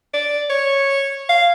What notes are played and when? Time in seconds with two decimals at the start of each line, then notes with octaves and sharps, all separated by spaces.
0.14 D5
0.50 C#5
1.29 F5